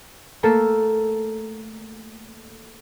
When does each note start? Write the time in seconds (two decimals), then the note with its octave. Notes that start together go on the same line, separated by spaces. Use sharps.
0.43 A3 A#3 A4